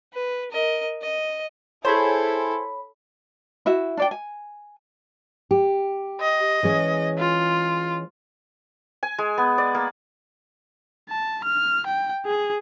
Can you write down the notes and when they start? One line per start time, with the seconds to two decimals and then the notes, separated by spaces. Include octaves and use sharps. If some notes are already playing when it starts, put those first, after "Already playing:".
0.13 B4
0.51 A#4 D#5
1.02 D#5
1.85 E4 G#4 A4 C5 C#5 B5
3.66 E4 F#4 E5
3.97 D4 D5 G5
4.11 G#5
5.51 G4
6.21 D#5
6.63 E3 G#3 C#4
7.18 F4
9.03 G#5
9.18 G#3
9.38 B3
9.58 D5
9.75 A#3
11.09 A5
11.44 F6
11.86 G5
12.26 G#4